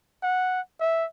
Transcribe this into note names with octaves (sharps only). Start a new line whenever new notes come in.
F#5
E5